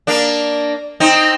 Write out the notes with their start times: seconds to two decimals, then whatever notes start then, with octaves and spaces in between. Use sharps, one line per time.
0.07 A#3 D4
1.00 C4 D#4